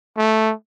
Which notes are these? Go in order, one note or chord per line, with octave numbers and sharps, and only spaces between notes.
A3